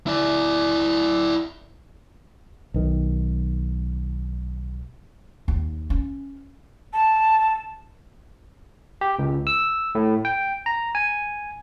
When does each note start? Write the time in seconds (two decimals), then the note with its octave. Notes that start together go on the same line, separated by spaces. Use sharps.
0.07 E4 D5
2.74 B1 D#3
5.48 D#2
5.90 C#4
6.93 A5
9.01 G4
9.19 C#2
9.47 E6
9.95 A2
10.25 G5
10.66 A#5
10.95 G#5